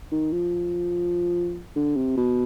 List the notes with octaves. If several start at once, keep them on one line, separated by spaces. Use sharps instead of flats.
D#3
F3
D3
C3
B2